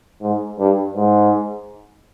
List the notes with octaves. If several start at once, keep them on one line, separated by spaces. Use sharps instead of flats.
G#2
G2
G#2